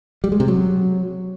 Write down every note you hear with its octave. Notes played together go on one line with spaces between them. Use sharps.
G3
G#3
C3
F#3